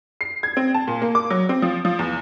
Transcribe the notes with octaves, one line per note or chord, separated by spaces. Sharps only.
C7
G#6
C4
A5
A#2
A#3
D6
F#3
C4
F3
F3
E2